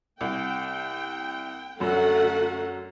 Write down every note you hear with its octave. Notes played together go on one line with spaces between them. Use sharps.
C2 G5
F#2 D3 F#3 A3 F#4 F#5